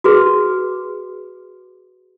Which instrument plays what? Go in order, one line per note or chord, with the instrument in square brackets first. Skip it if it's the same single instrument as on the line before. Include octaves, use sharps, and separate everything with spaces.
[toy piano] F#4 G#4 B4